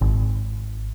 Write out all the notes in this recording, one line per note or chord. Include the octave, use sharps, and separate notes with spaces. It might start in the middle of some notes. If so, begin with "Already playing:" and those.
G#1